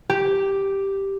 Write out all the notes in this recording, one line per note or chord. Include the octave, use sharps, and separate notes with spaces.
G4